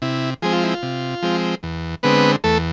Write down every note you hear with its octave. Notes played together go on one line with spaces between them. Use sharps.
C3 E4
F3 G#3 C4 G#4
F4
E4
F4
C3
F3 G#3 C4
E2
D3 G#3 B3 C4 B4
E2 A3 A4